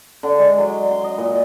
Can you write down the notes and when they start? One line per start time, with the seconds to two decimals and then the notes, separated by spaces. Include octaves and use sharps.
0.23 D3
0.39 G#3
0.58 F#3
0.91 C6
1.04 D#5
1.18 A#2